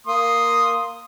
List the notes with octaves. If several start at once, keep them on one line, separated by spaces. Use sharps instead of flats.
A#3 C6 D#6